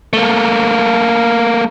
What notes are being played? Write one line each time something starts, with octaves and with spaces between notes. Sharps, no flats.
A3 A#3